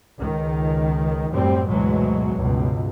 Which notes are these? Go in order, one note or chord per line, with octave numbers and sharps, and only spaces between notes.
C#2 D#3
F#2 A2 G3 C4
D2 G#2 B2 E3 F#3 G#3
C#2 G2 B2